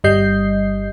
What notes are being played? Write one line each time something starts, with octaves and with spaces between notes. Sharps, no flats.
G1 G3 D#5 G6 C7